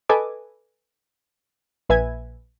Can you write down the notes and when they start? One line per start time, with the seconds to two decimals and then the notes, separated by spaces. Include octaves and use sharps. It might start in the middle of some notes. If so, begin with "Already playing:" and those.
0.09 A4 B4 D#5 G#5 D6
1.89 A#1 B4 E5 G#5 G#6